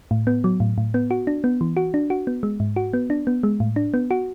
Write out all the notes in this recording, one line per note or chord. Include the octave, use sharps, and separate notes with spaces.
A2
B3
F#3
A2
A2
B3
F#4
D4
B3
E3
F#4
D4
F#4
B3
G#3
G#2
F#4
B3
D4
B3
G#3
A2
D4
B3
F#4